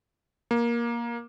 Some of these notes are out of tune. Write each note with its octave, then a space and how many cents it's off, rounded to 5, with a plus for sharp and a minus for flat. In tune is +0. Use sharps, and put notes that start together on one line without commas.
A#3 +15